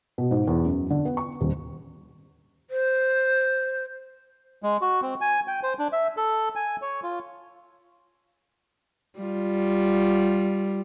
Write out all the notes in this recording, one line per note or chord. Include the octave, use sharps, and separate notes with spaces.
B2
G#2
E2
F#2
D3
B3
C#6
D#1
C5
G#3
F#4
C4
G#5
G5
C5
D4
E5
A4
G#5
C#5
F4
G3 F4